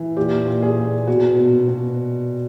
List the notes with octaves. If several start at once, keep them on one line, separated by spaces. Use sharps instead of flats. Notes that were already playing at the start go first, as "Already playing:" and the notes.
Already playing: E3
A#2 G4
A#2
G#4
A#2
B2 F#4
B2
B2